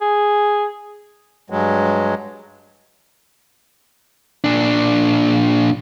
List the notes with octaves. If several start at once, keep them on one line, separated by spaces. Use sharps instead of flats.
G#4
G2 F#3 G#3
A#2 D4